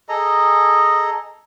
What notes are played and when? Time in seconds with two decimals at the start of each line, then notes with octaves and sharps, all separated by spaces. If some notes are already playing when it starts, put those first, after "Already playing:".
0.09 G#4 A4 D#5 A#5